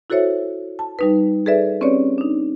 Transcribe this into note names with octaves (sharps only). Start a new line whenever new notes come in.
E4 F#4 A4 C5 C#5 E5
A5
G3 D#4 B4
G#4 A4 B4 D5 E5
C4 C#4 G4 B4 C#5 D5
D4 D#4